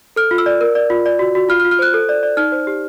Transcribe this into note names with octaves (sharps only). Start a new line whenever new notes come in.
A4 F6
F4
E6
D5
A#4
D5
F4
D5
F#4
F#4
F4 F6
F6
F4
F6
C5 F#6
A4
D5
D5
D#4 F6
C5
G4